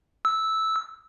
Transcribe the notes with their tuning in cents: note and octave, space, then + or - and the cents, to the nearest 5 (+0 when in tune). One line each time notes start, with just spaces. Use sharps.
E6 -10